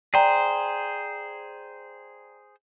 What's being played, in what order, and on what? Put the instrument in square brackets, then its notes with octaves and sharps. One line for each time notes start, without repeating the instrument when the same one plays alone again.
[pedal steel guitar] G#4 C5 [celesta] D5 G5 A#5